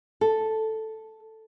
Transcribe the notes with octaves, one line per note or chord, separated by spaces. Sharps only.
A4